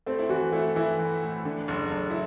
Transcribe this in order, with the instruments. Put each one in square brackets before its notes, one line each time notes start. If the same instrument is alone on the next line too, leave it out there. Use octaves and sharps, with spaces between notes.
[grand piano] A3 [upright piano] C4
[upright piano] E4
[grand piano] E3 [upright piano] F#4
[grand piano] A3 [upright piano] E4
[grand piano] E3 [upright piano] E4
[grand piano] E3
A2
D3
F#1
F#1
[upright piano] E4